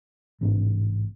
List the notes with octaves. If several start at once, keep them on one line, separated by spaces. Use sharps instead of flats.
A1 G#2 C3 D4